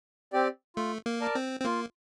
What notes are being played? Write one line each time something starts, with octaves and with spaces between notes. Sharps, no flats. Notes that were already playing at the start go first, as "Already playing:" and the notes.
C4 G4 D5
A3 F4
A#3
A#4 D5 A5
C4
C4
A#3 F4